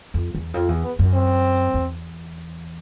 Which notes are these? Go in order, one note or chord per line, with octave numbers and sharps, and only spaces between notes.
F2
E2
F2 F3
E2
B3
F#2
C4
E2